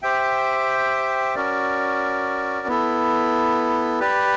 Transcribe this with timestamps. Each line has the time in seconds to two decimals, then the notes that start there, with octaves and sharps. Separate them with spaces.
0.02 G4 C5 E5 G5
1.35 C#4 F#4 A#4 D5
2.67 B3 E4 A4
4.00 G4 B4 D5